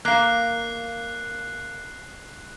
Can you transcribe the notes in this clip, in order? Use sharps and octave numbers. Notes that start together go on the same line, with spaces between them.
A#3 F5 F#6 C7